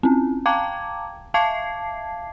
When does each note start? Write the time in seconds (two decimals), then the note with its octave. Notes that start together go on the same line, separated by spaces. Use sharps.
0.03 C4 C#4
0.46 F5 G5 A5 A#5 D6 G#6
1.34 E5 F5 A5 D6 G#6 C7